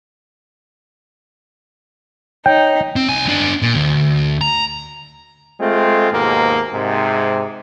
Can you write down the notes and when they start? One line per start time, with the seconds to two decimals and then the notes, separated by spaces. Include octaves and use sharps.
2.46 D#4 C#5 G5
2.96 C4
3.09 C2 G#5
3.29 B3 D4
3.62 A#2
3.75 D2
4.41 A#5
5.60 G#3 A3 C4 F4
6.12 D#2 G#2 B2 A#3
6.73 G#2 C3